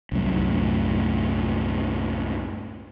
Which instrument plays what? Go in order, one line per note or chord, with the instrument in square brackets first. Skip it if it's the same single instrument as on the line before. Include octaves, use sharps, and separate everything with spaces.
[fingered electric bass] C2 F#2 A2